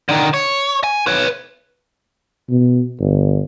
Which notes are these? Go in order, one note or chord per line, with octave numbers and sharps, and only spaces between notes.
D3 D#3
C#5
G#5
B4 C#5
B2
G1